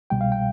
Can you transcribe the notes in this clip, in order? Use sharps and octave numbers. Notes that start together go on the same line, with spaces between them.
C2 B2 G3 G5
F5
G5